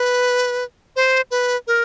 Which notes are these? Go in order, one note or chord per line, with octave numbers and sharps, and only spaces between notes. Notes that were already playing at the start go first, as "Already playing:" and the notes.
Already playing: B4
C5
B4
A#4